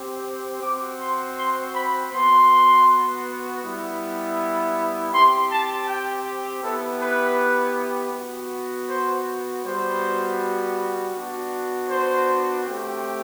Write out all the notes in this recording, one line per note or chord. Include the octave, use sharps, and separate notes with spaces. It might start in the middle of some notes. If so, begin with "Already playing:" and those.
Already playing: C4 G4
C4 F#4 D6
C6
C6
B5
B3 F#4 C6
G3 B3 E4
C4 G4 C6
A5
G5
B3 E4 G4 A4
B4
B3 F#4
C5
G3 B3 F#4 C5
B3 D4 F#4
C5
A3 C4 G4